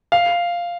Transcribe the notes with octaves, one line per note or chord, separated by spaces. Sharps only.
F5